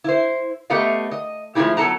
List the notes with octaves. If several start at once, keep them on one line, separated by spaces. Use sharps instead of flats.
E4 C5
A3 B3 G4 A4 D#5 F5
D#5
F3 G#3 A3 D#4 E4 G4
F#3 B3 A4 A5 A#5